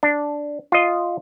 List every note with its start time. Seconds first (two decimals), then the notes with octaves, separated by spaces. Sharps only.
0.03 D4
0.72 F4 D#5